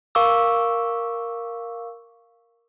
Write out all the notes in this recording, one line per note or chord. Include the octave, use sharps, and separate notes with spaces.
A#4 F5 C#6 D6 E6